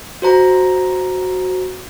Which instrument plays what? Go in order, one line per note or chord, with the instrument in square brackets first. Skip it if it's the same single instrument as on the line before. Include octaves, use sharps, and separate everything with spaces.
[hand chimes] F#4 C5 A#5